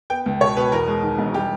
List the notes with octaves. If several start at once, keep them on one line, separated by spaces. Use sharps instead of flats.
B3 G5
C#2
B2 C#5
B2 B4
E2 A#4
G#3
D#3
E1
G3 G4